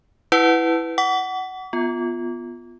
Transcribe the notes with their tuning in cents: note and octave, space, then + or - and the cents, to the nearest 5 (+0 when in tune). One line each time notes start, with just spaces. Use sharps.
E4 +0 B4 +10 F#5 +0
F#5 +15 D6 -45
B3 +0 F4 +0